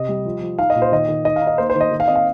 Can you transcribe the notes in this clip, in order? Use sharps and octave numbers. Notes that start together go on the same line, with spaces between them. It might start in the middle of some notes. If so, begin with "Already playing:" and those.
Already playing: C3 D#5
G3
F3
F3
D#4 F5
D#5
A#2
C5
D#3 D#5
D#3
D#4 D#5
F5
D#4
D#5
A#3 C5
C5
D#3
D#5
D#3
F5
C4 D#5
F5